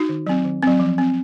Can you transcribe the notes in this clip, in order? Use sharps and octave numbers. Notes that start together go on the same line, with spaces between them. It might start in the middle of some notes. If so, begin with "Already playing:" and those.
Already playing: D#4 F#4
D#3
F#3 C4
D#3
F#3 C4
F3
C4